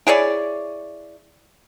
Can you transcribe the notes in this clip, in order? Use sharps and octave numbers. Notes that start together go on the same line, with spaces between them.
E4 G#4 C#5 D5